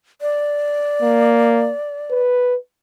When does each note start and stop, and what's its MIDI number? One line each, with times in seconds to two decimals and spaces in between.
0.22 2.20 74
1.02 1.71 58
2.10 2.55 71